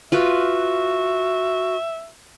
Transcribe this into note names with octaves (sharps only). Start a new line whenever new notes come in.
F4 F#4 B4 E5